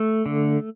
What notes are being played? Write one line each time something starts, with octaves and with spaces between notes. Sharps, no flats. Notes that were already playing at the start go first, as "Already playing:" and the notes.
Already playing: A3
D3